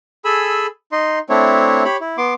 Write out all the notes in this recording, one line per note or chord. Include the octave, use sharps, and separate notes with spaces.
G#4 A4 G#5 B5 E6
D#4 D#5 C6
A3 C4 D4 E4 C#5
G4 C#5 B5
E4
B3 C6 D6